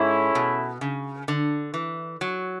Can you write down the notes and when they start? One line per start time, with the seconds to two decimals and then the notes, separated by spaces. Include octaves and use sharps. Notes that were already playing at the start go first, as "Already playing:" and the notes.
Already playing: G#2 G#3 C#4 E4 A4
0.35 B2
0.81 C#3
1.28 D3
1.74 E3
2.21 F#3